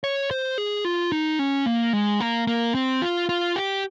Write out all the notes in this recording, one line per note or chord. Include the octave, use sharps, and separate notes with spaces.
C#5
C5
G#4
F4
D#4
C#4
A#3
G#3
A#3
A#3
C4
F4
F4
G4